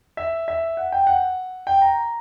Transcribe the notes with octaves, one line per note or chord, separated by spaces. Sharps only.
E5
E5
F#5
G5
F#5
G5
A#5